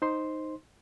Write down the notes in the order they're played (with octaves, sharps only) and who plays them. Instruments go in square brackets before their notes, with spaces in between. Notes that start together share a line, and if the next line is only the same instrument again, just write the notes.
[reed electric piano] D#4 C5 C6